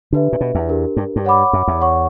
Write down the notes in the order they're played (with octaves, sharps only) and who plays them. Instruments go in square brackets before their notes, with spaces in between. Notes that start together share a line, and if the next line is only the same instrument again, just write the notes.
[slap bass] D3 [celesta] D4 G4 B4 E5
[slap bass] A#2
B2
E2
[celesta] D4 G4 A#4
[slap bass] G2
G2
[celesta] C#5 F#5 B5 D6
[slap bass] F#2
E2
[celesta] C#5 F#5 C#6